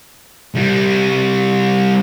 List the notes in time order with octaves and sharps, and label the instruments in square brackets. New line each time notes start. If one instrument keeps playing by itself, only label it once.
[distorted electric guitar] C2 G3